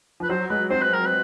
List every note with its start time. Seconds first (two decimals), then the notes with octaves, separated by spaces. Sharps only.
0.20 F3 B4
0.30 F#3 C5
0.50 G#3 B4
0.70 C4 C5
0.82 B4
0.94 A#4
1.06 B4